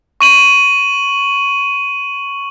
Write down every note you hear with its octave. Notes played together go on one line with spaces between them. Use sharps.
C#6 D#7 F#7